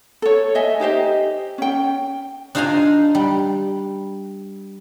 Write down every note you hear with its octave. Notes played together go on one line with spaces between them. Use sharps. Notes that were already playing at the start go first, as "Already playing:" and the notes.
A4 C#5
D#5 E5 G#5
D#4 G4 C5 D#5
C#4 G5
D4 D#4 F4 F5 G#5 A#5
G3